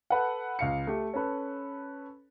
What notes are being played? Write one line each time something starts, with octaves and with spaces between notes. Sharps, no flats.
A4 B4 F#5
C#2 F5 C#7
A3 G4
C#4 A4 B4